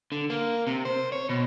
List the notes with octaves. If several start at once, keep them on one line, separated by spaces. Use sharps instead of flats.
D3
A#3
C3
C5
C#5
B2